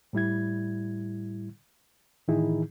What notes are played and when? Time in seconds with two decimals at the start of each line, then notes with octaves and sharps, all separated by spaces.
0.13 A2 G3 E4 G#6
2.28 A2 D#3 E3 D#4 E4 G#4